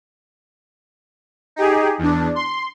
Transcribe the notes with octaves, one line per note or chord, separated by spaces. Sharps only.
D#4 G4 G#4
E2 D4
C6